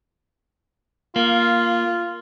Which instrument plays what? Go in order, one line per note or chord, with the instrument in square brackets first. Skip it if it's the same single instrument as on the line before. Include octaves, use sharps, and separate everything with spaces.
[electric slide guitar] A#3 [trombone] F4